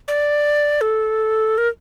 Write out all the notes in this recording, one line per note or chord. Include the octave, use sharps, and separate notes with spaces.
D5
A4
A#4